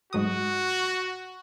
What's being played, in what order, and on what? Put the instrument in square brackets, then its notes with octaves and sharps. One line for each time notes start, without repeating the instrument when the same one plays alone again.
[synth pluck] G#2 F#3 D#6 [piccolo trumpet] F#4